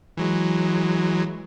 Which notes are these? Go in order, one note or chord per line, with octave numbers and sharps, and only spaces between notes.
E3 F#3 G#3